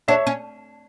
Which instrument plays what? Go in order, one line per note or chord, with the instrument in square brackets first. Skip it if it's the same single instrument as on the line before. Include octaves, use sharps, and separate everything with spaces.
[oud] D4 [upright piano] C#5 E5
[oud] C#4